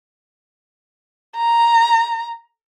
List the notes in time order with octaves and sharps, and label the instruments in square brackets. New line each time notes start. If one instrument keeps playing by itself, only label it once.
[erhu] A#5